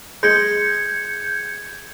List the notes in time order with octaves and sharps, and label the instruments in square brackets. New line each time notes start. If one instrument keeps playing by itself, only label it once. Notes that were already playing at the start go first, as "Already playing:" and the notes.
[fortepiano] G#3 [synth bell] G6 G#6 C#7